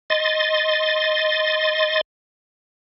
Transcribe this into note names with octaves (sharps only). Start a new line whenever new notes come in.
D#5 C6 A6